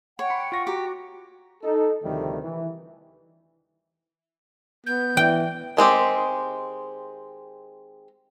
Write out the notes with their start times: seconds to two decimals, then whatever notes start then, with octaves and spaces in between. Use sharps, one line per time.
0.19 C#5 F#5 G5
0.30 B5 C6
0.52 F4 C#6 A#6
0.67 F#4 G4 A#5 C#6
1.63 D#4 A4
2.03 D2 C3 D#3 F3 G3 A3
2.43 E3
4.86 B3 G6
5.17 E3 G5
5.77 D#3 G#3 C4 G4